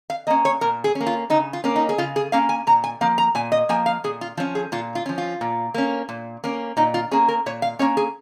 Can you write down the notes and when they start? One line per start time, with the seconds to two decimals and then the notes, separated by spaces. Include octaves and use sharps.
0.10 F5
0.27 A#3 C#4 D#5
0.45 C#5
0.61 A#2 A#4
0.84 G#4
0.95 C#4
1.01 A#3
1.07 F4
1.30 C#3 D#4
1.53 F4
1.64 A#3 C#4
1.76 D#4
1.89 G#4
1.98 C#3 F4
2.16 G#4
2.32 A#3 C#4 F5
2.49 G#5
2.67 A#2 A#5
2.84 G#5
3.01 F3 A#3 F5
3.18 A#5
3.35 A#2 G#5
3.52 D#5
3.69 F3 A#3 G#5
3.86 F5
4.04 A#2 G#4
4.21 F4
4.37 F3 C#4 F4
4.55 G#4
4.72 A#2 F4
4.95 F4
5.06 F3 C#4
5.18 F4
5.41 A#2
5.74 A#3 C#4
6.09 A#2
6.44 A#3 C#4
6.77 A#2 D#4
6.94 F4
7.11 A#3 C#4 G#4
7.28 A#4
7.46 A#2 C#5
7.62 F5
7.79 A#3 C#4 C#5
7.97 G#4